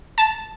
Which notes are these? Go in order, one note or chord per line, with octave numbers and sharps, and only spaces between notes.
A5